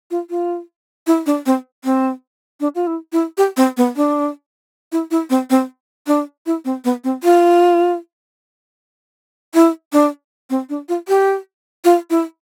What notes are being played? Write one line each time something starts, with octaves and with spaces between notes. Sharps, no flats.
F4
F4
E4
D4
C4
C4
D4
F4
E4
E4
G4
C4
B3
D4
E4
E4
C4
C4
D4
E4
C4
B3
C4
F4
E4
D4
C4
D4
F4
G4
F4
E4